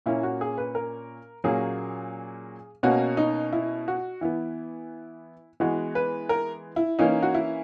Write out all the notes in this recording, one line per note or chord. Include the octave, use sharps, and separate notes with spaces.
A#2 A#3 C#4 E4
F#4
G#4
B4
A#4
A#2 F#3 A#3 C#4 G#4
B2 A#3 C#4 F#4
D#4
E4
F#4
E3 B3 E4
E3 G#3 B3 F#4
B4
A#4
E4
E3 A#3 C#4 D#4
F#4
E4